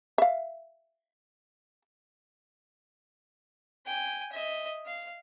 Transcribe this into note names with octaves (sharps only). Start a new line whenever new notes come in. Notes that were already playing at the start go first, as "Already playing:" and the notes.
E5 F5
G5 G#5
D#5 E5
F5